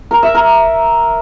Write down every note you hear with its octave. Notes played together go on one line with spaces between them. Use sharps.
A#4
E5
A#4